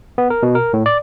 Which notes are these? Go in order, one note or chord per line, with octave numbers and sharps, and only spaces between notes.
B3
A#4
B2
A#4
A2
D5